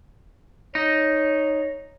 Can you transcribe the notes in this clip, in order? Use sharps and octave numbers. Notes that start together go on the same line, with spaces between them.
D#4 C#5